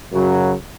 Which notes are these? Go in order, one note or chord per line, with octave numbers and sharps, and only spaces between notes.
F#2 C#3 F#3